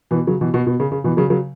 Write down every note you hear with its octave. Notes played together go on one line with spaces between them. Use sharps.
B2 E3
C#3 F#3
B2 E3
B2
B2
C#3
C#3
B2 E3
C#3 F#3
C#3 F#3